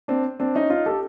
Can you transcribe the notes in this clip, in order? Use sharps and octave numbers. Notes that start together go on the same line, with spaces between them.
C4 D4
C4 D4
C#4 D#4
D#4 F4
G4 A4